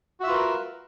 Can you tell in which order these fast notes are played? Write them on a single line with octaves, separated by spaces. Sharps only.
F#4 E5 F4 B4 A#4